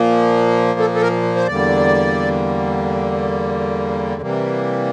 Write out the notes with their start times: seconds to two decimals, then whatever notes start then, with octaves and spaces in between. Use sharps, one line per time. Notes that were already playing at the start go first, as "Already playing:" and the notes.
Already playing: A#2 F3 A#3
0.79 A4
0.95 A4
1.02 A#4
1.36 C5
1.47 E2 D3 G3 A#3 D5
4.21 C3 E3 G3 A#3